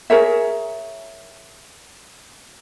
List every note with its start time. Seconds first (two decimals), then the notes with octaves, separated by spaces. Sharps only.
0.10 G#4 A#4 C#5 E5